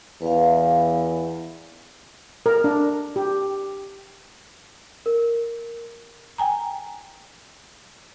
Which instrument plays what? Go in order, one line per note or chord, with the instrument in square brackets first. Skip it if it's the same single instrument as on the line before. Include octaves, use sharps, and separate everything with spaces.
[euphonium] E2 [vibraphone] B4 E5 F5
[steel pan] A#4
D4
G4
[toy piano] A#4
[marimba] G5 G#5 A#5